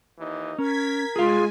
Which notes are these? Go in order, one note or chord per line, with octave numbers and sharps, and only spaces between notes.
D#2 E3 D#4
C#4 A#4 G#6 B6
G#3 F4 G#4 F5 G#5